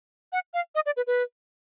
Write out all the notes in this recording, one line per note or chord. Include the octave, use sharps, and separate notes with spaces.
F#5
F5
D#5
D5
B4
B4